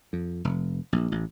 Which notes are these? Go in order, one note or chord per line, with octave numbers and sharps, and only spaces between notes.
F2
F1
A#1
A1